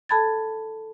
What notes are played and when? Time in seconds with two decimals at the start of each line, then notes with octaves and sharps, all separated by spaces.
0.09 A4 A5 B5 G#6 A6